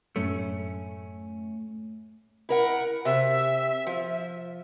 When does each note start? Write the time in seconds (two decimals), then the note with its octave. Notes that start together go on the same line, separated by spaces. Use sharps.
0.16 F#2 A2 F#3 A3 C#4
2.49 E4 A#4 F#5
3.05 C3 E5
3.87 F3